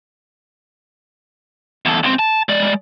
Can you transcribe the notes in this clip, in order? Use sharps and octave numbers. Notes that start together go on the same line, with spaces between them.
E2 A4
C#2 C4
A5
G#3 D5